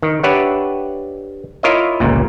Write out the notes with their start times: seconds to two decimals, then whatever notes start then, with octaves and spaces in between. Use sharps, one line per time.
0.03 D#3
0.23 D4 G4 B4 C#5 E5 F#5
1.63 E4 F4 A#4 C#5 D#5 E5
2.00 G1 C#2 A#2